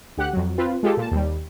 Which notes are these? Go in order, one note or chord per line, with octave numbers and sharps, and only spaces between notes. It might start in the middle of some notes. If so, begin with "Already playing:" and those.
D2 G4 F#5 F#6
F2 F#3
C4 F4 B4
G#3 F4 G4 A4
A#2 A5
D#2 G3